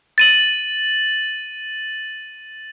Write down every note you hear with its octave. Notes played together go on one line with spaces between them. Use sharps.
A6 D#7 F#7